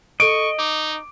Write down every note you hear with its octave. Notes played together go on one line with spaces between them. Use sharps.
A4 D#5 C#6 C#7 D7
D#4 D6